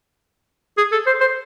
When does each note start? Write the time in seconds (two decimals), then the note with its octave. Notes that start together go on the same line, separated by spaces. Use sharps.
0.77 G#4
0.92 A4
1.06 C5
1.20 C5